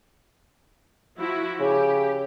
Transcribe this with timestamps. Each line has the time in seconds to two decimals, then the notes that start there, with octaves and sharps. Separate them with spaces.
1.19 F3 E4 F#4
1.60 C#3 G4